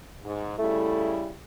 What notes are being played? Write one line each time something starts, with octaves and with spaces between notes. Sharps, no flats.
G#2
C#3 G3 A3 E4